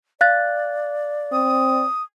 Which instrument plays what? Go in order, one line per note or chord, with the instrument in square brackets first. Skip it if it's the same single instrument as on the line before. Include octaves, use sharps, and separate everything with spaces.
[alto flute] D5 [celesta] F5 F#6 A6
[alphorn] C4 [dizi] D#6